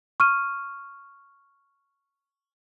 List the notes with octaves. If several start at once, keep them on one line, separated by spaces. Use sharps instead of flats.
C#6 F6 D#7